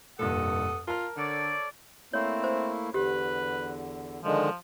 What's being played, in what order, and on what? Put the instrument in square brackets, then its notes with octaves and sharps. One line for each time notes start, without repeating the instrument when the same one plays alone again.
[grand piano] F1 G2 A#2 [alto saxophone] A4 [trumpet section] F#5 D#6
[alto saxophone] F4 [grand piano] A#4 A5 F6
[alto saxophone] D3 [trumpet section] A4 C#5 D5
[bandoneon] A3 A#3 E4 [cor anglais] C4 [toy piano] C#5
[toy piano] C5
[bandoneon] E2 D3 [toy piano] G4 [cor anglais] B4
[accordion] D3 D#3 G#3 [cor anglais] F3